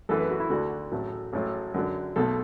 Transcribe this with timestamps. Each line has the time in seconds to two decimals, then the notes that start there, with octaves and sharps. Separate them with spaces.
0.09 F#2 E3 A3 A4
0.19 B4
0.30 F#4
0.40 E4
0.50 D2 D3 A3 F#4
0.92 A1 A2 F#3 A3
1.33 A1 A2 F#3 A3
1.74 F#2 D3 F#3
2.16 B1 B2 A3 A4